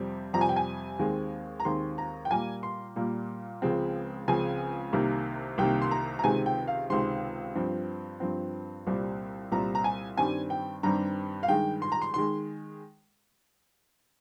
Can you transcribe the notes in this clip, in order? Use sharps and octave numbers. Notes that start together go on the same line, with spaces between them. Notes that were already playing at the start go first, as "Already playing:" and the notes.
Already playing: F2 C3 G3 C4
F2 C3 G3 C4 A#5
G#5
G5
G#5
D#2 D#3 G#3 C4
A#5
D#2 D#3 G#3 C4 C6
A#5
G5
A#2 G3 A#3 G#5
C6
A#2 G3 A#3
C#2 C#3 F3 G#3 C4
C#2 C#3 F3 G#3 C4 G#5
C2 C3 D#3 A#3
C2 C3 D#3 A#3 G5
C6
A#5
A#5
C#2 C3 D#3 G#3 C4 G#5
G5
F5
C#2 C3 D#3 G#3 C4 C6
G2 F3 C4
G2 F3 C4
C2 A#2 G3 C4
C2 A#2 G3 C4 A#5
A#5
G#5
G2 D#3 G3 C4 G#5
G5
G2 D#3 G3 C4 A#5
F5
G2 D#3 G#3 G5
C6
A#5
C6
D#3 G#3 C6